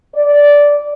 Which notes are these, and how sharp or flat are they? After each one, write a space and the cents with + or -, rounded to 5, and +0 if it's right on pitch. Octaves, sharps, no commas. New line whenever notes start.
D5 -10